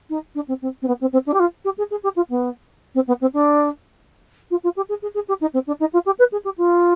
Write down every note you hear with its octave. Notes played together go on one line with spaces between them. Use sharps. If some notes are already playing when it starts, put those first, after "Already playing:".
D#4
D4
C4
C4
C4
B3
C4
C4
D4
G4
F4
G4
G#4
G#4
G4
F4
B3
C4
B3
C4
D4
F4
F4
G4
G#4
G#4
G#4
G4
D#4
C4
D4
D#4
F4
G4
B4
G#4
G4
F4